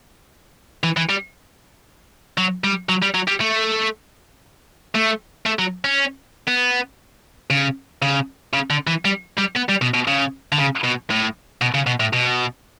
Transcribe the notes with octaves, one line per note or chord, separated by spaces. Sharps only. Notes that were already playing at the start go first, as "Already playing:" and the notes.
E3
E3
G3
F#3
G3
F#3
G3
F#3
G3
A3
A3
A3
F#3
C#4
B3
C#3
C#3
C#3
D3
E3
G3
G3
B3
G3
B2
B2
C#3
D3
C#3
B2
A2
B2
C#3
B2
A2
B2